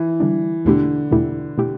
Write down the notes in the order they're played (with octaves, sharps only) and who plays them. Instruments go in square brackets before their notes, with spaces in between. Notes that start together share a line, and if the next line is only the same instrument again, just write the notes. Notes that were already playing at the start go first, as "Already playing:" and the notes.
Already playing: [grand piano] E3
[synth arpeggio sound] D3 G3 D4
[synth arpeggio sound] E2 B2 A3 E4 G4 [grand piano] D3
[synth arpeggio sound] E2 B2 A3 E4 G4
B2 A3 E4 G4